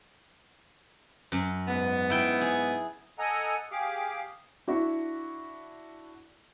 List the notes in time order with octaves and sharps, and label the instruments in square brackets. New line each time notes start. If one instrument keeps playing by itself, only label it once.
[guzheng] F#2
[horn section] G#2 B3
[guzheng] E4 G5
G#4
[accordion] A4 D#5 F#5 G#5 A#5
G4 G#4 F5 D6
[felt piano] D4 E4 F#4